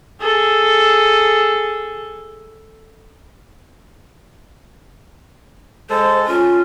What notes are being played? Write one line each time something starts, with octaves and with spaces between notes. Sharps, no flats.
G#4 A4
G#3 A4 C5
C#4 F4